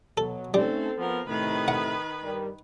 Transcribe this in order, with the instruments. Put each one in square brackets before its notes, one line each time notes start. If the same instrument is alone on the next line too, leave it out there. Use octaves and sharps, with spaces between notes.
[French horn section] B2 F#3 [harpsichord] A4
[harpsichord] G3 [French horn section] A3 C#4 D#4 [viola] C4 A4
[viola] F3 A#4 [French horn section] B3
[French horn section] A2 C3 A3 [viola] D#3 B4
[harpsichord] F#5
[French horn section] G2 G3 A#4